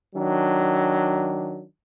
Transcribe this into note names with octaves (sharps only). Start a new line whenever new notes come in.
D#3 F#3 D4